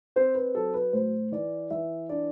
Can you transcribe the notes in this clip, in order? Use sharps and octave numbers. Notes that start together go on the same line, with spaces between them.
C4 C5
B4
F#3 A4
B4
A2 C5
E3 D5
E3 E5
D4 D5